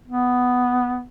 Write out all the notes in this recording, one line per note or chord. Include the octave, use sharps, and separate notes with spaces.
B3